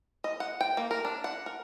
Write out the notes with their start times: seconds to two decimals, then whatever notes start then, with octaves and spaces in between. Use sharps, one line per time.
0.24 D#5
0.40 F#5
0.61 G5
0.77 A#3
0.91 A#4
1.05 D4
1.24 F#5
1.46 A#4